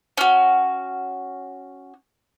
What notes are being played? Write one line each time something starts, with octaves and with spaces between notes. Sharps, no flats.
C#4 F#4